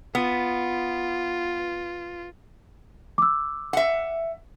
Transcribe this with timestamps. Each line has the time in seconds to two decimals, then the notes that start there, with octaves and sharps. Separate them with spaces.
0.15 B3 F4
3.18 D6 E6
3.73 E5 F#5